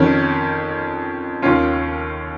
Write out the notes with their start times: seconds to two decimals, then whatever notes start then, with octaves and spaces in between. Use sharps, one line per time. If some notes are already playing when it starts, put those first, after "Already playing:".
Already playing: F2 D#3 C#4
1.42 D#2 D#3 C#4 F4